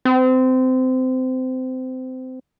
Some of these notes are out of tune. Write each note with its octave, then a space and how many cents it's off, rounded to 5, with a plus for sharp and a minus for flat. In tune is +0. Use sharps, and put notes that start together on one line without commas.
C4 -25